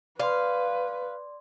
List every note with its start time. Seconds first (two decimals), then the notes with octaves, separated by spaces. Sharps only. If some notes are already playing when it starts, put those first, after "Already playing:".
0.20 B4 D5 F5 C6